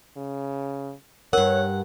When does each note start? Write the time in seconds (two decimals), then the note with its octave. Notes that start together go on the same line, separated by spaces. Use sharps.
0.17 C#3
1.33 G2 A#4 C#5 F#5